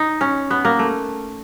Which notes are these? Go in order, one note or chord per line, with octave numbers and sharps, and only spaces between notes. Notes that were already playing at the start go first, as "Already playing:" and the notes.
Already playing: D#4
C#4
B3
A#3
A3